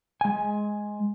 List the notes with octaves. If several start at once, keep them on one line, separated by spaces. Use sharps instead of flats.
G#3 G#5